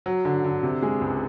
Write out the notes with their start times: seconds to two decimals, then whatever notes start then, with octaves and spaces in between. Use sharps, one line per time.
0.06 F#3
0.25 D3
0.44 D3
0.63 C3
0.82 G#3
1.01 C#2